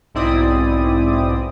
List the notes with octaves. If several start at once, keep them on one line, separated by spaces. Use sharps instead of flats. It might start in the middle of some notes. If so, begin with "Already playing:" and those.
B1 G#2 C4 E4 D5 D#6